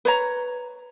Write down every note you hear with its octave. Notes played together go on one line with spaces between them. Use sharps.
B4 C#5 A#5